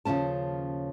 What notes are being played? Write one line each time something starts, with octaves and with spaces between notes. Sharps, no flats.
D#2 C#3 F3 C#4 A5